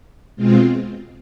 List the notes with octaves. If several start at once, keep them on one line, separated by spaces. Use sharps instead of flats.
B2 G#3 C4 F4